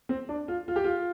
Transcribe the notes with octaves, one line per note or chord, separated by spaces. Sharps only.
C4
D4
F4
F4
G4
F4